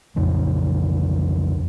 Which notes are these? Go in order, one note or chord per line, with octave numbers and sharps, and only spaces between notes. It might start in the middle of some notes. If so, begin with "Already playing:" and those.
B1 F2 C#3 F3